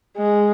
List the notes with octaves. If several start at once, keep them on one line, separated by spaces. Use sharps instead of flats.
G#3